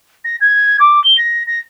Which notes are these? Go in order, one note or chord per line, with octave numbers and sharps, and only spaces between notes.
A#6
G#6
D6
G7
A#6
A#6